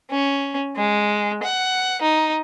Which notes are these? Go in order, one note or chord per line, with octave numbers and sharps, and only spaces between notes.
C#4
G#3
F#5
D#4